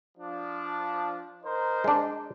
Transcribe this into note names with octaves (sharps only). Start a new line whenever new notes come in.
F3 D4
D#4 A#4 C5
G#3 D4